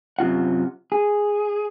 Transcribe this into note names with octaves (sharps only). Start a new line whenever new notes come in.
F#2 C3 F4 F#5
G#4